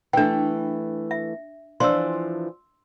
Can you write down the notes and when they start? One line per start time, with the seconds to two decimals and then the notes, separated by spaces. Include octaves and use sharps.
0.13 E3 A3 D4 G5
1.11 E5
1.80 E3 F3 D4 C6 E6